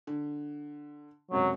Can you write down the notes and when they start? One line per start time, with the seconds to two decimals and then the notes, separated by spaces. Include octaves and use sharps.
0.07 D3
1.31 C#2 F#2 C3 F#3